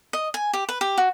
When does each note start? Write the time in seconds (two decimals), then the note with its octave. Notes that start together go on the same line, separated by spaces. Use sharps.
0.13 D#5
0.34 G#5
0.53 G4
0.69 B4
0.81 G4
0.98 F#4